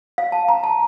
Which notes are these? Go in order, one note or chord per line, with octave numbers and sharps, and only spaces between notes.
F5
A5
A#5
A5